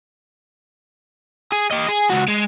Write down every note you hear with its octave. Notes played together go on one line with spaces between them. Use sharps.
G#4
G4 D#5
G#4
C#2 F#4
G#3